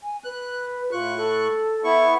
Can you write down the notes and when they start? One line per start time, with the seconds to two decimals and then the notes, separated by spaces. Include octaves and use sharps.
0.03 G#5
0.24 B4 F#6
0.92 A2 F4 C#6 F#6
1.17 A4
1.84 B3 E4 C#6